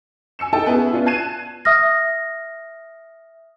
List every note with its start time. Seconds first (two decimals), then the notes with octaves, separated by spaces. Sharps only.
0.39 G#5 E6 C#7 E7
0.53 D#4 E4 A4 G5 A5
0.66 B3 C#4 E4 G#4
0.93 B3 C#4 D4 F4
1.06 A5 F#6 G#6 C7 D#7 E7
1.65 E5 D#6 F6 A#6